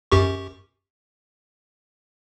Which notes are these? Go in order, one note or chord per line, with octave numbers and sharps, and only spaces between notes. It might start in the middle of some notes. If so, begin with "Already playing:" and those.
F#2 G4 C#6